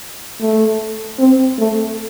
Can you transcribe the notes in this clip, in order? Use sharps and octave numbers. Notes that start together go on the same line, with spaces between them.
A3
C4
A3